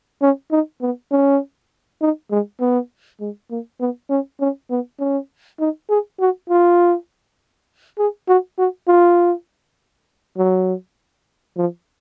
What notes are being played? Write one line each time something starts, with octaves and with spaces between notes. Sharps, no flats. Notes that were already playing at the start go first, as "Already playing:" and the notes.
C#4
D#4
B3
C#4
D#4
G#3
B3
G#3
A#3
B3
C#4
C#4
B3
C#4
D#4
G#4
F#4
F4
G#4
F#4
F#4
F4
F#3
F3